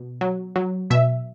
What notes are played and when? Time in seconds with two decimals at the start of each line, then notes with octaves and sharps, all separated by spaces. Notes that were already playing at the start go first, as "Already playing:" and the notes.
Already playing: B2
0.21 F#3
0.56 F#3
0.90 B2 E5